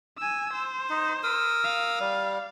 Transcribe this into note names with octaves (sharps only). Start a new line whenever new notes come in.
G#5 E6
C5
D#4
A#4 D#6 E6
F5
G3